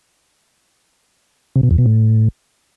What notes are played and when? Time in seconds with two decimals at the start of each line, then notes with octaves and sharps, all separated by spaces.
1.56 C3
1.63 B2
1.71 E2
1.78 B2
1.86 A2